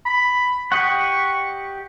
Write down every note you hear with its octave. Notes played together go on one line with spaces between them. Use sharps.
B5
G4 D#5 F#5 C#6